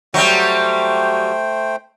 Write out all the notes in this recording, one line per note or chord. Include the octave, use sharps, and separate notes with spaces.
F#3 G3 A3 C5 G5